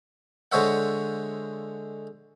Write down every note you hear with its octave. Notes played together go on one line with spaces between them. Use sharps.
D3 G#3 C5 C#5 E5 F#5